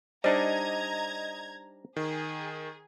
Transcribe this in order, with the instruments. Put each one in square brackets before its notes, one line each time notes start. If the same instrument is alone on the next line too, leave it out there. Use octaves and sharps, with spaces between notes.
[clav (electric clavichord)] G3 D4 D#4 [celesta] C5 [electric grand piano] D#5 [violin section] A#5 G#6
[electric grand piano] D#3 [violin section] G#4